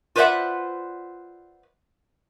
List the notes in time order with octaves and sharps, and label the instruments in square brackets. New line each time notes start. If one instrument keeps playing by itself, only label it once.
[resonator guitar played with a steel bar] F4 B4 C5 D5 E5 F#5